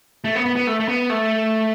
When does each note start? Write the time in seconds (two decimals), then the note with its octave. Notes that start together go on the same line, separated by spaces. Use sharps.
0.24 A3
0.35 B3
0.46 B3
0.56 B3
0.67 A3
0.80 A3
0.88 B3
1.10 A3